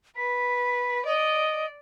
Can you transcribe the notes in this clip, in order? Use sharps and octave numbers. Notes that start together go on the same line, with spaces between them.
B4 B6
D5 D#5